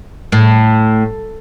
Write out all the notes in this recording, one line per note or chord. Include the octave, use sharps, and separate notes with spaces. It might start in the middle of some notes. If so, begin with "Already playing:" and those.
A2